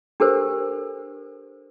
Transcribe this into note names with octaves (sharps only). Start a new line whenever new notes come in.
D4 G4 A4 A#4 C5